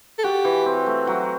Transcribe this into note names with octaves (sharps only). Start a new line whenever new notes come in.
A4
F#4 G4
E3
C4
A3
F#3